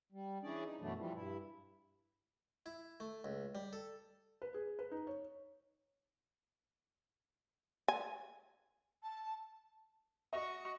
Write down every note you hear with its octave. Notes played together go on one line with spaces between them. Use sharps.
G3
E3 C#4 D4 G#4 D5
D#4
F#2 B2 E3 F#3 A3 D4
B2 E3 F3 G3
G2 E4
E4
A3
C#2
G3
A4
B4
G#4
B4
D#4
C#5
G#5
A5
F#4 D#5 C#6